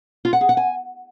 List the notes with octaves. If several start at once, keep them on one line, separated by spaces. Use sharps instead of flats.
F4
F#5
G#4
F#5
G#5